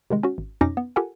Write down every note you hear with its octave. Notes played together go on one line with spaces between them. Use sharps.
C3 D#3 G#3
C#4 F#4
G#1
F2 B2 C#4 D#4 D6 A#6
B3
F4 G4 A4 A#4 F#5 G#5